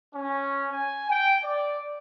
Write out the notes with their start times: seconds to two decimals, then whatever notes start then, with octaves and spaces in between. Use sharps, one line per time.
0.14 C#4
0.71 G#5
1.08 G5
1.44 D5